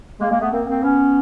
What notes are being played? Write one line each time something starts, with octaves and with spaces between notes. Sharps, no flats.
G#3 A#3
G#3 A#3
A3 B3
A#3 C4
A#3 C4
B3 C#4